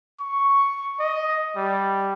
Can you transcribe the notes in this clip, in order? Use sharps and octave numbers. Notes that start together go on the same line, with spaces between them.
C#6
D#5
G3